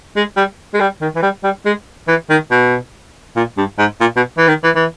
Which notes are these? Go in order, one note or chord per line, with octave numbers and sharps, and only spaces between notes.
G#3
G3
G#3
G3
D#3
E3
G3
G3
G#3
E3
D#3
B2
A#2
G2
G#2
A#2
B2
E3
D#3
E3
E3